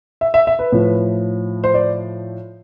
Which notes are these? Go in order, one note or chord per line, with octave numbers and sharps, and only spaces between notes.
E5
E5
E5
B4
A2 F3
C5
D5